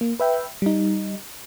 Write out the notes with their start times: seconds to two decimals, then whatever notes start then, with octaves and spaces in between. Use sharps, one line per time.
0.01 A#3
0.20 B4 E5 G5
0.62 G3 D#4